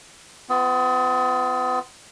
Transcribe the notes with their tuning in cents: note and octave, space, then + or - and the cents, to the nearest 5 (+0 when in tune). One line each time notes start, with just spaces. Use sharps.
B3 +40 F4 -15